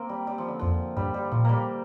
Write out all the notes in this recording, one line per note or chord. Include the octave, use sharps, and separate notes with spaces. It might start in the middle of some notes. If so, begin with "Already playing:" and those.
Already playing: A#3 C4
G3
G3
F3
D3
F2 F3
G2 G3
G3
A#2 F3
G3 A#3